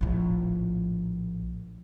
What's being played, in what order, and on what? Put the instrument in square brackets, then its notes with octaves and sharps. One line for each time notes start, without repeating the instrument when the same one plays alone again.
[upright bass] A#1 A2